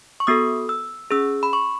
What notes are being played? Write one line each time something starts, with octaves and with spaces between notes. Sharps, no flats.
C#6
B3 F#4 A4 D#6
E6
C#4 G#4 E6
B5
C#6